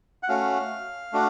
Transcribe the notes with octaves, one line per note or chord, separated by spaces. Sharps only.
F#5
A3 C#4 F#4 F5
A3 D4 F#4